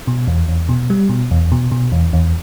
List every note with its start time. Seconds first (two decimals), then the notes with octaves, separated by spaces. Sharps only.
0.07 B2
0.27 E2
0.48 E2
0.69 B2
0.90 G3
1.09 B2
1.31 E2
1.52 B2
1.72 B2
1.92 E2
2.13 E2